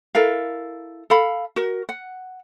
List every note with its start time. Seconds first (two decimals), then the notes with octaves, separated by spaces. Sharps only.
0.15 E4 A4 A#4 F5
1.10 A4 F5 B5
1.56 F#4 A#4
1.89 F#5